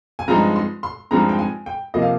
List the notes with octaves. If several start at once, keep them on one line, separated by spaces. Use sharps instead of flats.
G#5
G2 F3 G#3 C4 D#4 A#5
C6
C6
G2 F3 G#3 C4 D#4 A#5
G5
G#5
G5
C3 F3 A#3 D#5
F5